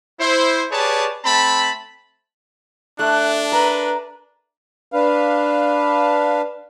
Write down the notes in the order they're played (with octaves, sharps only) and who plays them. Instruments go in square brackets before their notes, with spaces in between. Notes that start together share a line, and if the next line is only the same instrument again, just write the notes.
[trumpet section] E4 C5
G4 G#4 B4 C#5 D5 A5
A3 C4 A5 B5
[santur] A3 [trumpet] D4 [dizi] F#6
[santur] A#4 [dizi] B4
[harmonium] D4 B4 F5